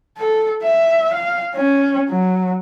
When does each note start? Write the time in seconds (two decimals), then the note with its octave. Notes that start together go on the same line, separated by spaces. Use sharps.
0.18 A4
0.63 E5
1.14 F5
1.56 C#4
2.10 F#3